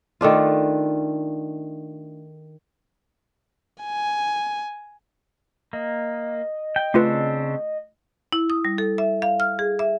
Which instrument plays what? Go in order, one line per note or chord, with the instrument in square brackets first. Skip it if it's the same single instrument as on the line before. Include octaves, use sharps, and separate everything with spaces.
[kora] D#3 A3 D4 F4
[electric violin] G#5
[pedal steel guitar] A#3 [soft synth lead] D#5
[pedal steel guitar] G5
[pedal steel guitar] C#3 C4 D4 [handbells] A3 F4 B4
[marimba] E4
D#6
G3
A4
E5
F5
F6
G#4
E5